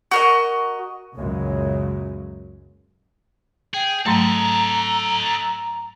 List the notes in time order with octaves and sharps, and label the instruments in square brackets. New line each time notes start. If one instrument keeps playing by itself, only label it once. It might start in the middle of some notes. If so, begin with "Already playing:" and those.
[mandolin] F#4 A#4 D#5
[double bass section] C#2 F#2 A#2 C#3 F#3 G#3
[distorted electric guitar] G#4 [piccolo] G5
[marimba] G#2 F#3 A3 [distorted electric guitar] A4 D#5 [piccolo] A#5